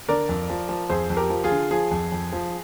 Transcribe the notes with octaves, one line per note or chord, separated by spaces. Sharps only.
D3 A#4 D5
F2
F3
F3
F2 G#4 C5
F2
G4 A#4
F3
F4 G#4
D3
F3 F4 G#4
F2
F2
F3